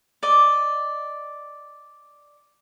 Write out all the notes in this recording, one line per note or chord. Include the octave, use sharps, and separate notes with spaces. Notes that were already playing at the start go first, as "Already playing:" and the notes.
D5 D#5